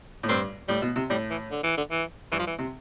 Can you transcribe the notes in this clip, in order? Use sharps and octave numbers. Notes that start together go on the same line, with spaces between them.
A2
G2 C4
A2 G3
B2
C3
A2 G3
E3
D3
E3
D3
E3
G2 E3
F3
E3
C3